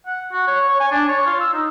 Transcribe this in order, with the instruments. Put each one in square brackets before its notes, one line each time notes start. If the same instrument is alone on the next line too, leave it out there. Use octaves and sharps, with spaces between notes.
[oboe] F#5
F#4
C#5
C#5
G#5
D4
C#5
F4
E6
D#4